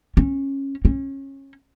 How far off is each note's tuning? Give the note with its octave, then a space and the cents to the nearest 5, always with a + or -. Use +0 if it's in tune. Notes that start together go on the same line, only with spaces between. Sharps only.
C#4 -20
C#4 -25